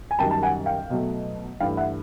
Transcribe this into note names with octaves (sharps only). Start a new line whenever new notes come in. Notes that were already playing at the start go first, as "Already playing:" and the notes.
G#5
F#2 D#3 G3 G5 A5
A5
F#5 G#5
F5 G5
B2 F#3 A3
G2 E3 A3 F5 G5
E5 F#5